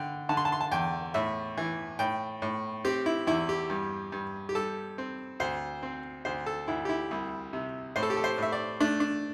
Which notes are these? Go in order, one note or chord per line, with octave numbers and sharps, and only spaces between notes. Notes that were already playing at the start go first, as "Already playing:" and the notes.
Already playing: D3 G5
D3 A5
C6
A5
C6
A5
E2 G5
A2 E5
E3
A2 G5
A2
C4 G4
E4
E2 E4
G4
G2
G2
G4
G3 A4
C4
D2 C5
C4
D2 C5
A4
D2 E4
G4
E4
C2
C3
A2 C5
A4
G4
A4
C5
A2 E5
D5
A3 D4
D4